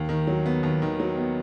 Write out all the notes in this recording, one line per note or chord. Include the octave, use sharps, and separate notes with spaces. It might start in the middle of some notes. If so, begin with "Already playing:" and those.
Already playing: D#2
D#3
F#3
B3
D#2
D#3
F#3
B3